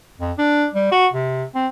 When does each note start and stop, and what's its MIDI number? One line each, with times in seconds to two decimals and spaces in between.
0.20 0.32 41
0.38 0.67 62
0.75 0.87 55
0.92 1.07 66
1.13 1.44 48
1.55 1.67 60